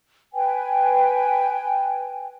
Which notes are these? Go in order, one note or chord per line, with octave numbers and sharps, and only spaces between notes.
B4 G5 G#5